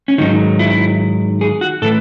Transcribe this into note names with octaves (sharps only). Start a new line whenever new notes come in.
C#4
G#2 D#3 F#3 D#4
E4
G#4
F#4
A2 E3 A4